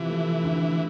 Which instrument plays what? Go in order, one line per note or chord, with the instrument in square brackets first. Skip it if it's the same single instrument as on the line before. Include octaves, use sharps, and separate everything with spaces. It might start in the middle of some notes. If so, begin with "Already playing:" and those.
Already playing: [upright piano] C3 F3 [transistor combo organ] E3
[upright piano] A3
D2